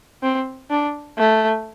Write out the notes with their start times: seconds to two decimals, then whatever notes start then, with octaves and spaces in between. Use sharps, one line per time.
0.23 C4
0.70 D4
1.18 A3